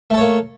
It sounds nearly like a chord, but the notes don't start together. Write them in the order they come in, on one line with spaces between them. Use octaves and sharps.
A3 A4 C#5 A#3